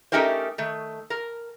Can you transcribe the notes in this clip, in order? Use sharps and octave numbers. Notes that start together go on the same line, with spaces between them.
A3 C#4 D#4 G4 A#4 C5
D#3 A3
A#4